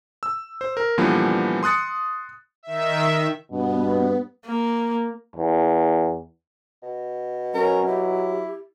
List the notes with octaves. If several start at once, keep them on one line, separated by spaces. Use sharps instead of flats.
E6
C5
A#4
A#2 D3 E3 F3 G3 B3
C6 D#6 F#6 A6 C#7
D#3 E5
G2 B2 B3
A#3
E2
B2
F#3 C#4 A#4
E4 G4